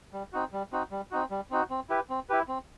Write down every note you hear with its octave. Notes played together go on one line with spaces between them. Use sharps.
G3
C4 D#4 F#4
G3
C4 D#4 F#4
G3
C4 D#4 F#4
G3
C4 D#4 F#4
C4
E4 G4 B4
C4
E4 G4 B4
C4